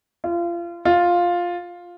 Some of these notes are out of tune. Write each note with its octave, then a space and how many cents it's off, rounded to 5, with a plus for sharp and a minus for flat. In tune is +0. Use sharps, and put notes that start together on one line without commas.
F4 -30
F4 +5